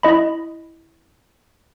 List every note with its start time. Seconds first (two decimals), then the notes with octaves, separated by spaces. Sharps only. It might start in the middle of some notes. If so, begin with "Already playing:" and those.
0.03 E4 D#5 B5